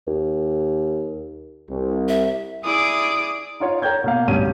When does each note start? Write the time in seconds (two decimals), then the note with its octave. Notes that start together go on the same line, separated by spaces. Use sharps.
0.07 D#2
1.69 C2
2.08 E5
2.64 E4 G#4 D5 D#6 D7
3.60 D#4 F4 C#5 F5
3.82 A#4 C#5 G5 G6 G#6
4.04 B2 A#3 F5
4.27 D1 B1 G2 C#4 D#7